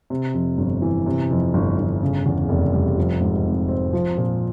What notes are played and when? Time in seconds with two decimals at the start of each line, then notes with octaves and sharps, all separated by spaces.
0.10 C3
0.34 F2
0.58 G1
0.82 E3
1.06 C3
1.31 F2
1.54 G1
1.78 G1
2.02 C#3
2.26 E2
2.49 F1
2.73 G3
2.98 F3
3.21 G#2
3.45 G#1
3.69 C4
3.93 F3
4.17 A#2